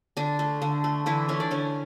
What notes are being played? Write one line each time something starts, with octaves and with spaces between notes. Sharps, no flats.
D3 D4
A3
D3
A3
D3 E3 E4
A3 C#4 C#5
D4 D5
D3 C#4 C#5